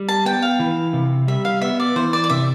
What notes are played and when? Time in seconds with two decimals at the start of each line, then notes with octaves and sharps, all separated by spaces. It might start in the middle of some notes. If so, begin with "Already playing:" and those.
Already playing: G3
0.09 A5
0.25 B3 G5
0.42 F5
0.60 E3
0.93 C3
1.28 G3 E5
1.45 F5
1.61 B3 E5
1.80 D5
1.96 E3 C5
2.13 D5
2.24 D5
2.30 C3 E5